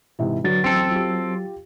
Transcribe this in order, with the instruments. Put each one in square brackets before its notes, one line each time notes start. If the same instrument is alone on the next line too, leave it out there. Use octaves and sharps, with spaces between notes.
[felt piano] G#2 C3 E3
[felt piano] D3 F#4 B4 [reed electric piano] F#3 A6
[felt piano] A1 [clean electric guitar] C4 A4
[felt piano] F4 G4